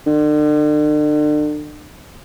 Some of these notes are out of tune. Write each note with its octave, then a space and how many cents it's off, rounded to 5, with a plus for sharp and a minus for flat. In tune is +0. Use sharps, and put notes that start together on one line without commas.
D3 +40